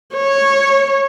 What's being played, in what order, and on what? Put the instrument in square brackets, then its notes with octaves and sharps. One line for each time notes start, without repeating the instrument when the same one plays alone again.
[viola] C#5